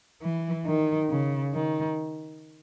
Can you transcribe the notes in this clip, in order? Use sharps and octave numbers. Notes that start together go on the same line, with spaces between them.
E3
D#3
C#3
D#3